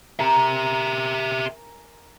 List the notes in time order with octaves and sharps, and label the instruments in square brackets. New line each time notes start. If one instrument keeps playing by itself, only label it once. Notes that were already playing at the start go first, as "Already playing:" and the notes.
[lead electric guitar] G4 E5 [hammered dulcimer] A#4 G#5 A#5